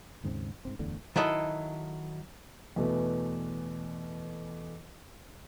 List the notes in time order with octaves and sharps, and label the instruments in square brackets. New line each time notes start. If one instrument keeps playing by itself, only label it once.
[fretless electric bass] D#2 G#2 C#3 C4
G#2 C#3 C4
D1 E2 A2 D3
[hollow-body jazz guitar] D#3 F#3 E4 A4 D#5
[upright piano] E2 B2 E3 A3 B3